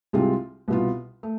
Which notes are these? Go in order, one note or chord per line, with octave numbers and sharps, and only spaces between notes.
C2 C3 G#3 C4 F4
C2 B2 B3 F4
A3